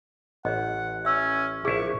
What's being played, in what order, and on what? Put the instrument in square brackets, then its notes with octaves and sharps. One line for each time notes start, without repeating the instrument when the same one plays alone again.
[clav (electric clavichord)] A1 [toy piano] D#5 [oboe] F#5
[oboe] C#4 [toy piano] E5 E6
[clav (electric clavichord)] A#1 E4 [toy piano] G#4 [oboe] C#6